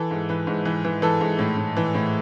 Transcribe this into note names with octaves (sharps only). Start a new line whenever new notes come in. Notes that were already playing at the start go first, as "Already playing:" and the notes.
Already playing: E3 A4
G#2
E3 B4
G#2
E3
E3
E3 A4
G#2
A2
A2
E3
A2